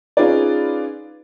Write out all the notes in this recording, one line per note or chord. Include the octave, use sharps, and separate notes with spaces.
C#4 D#4 F4 G#4 B4 D5